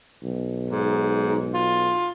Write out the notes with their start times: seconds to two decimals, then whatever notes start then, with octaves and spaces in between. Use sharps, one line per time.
0.23 B1
0.70 G#2
1.54 F4